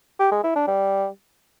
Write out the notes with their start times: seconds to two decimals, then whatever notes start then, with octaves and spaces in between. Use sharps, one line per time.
0.20 G4
0.31 G#3
0.43 E4
0.55 D4
0.67 G3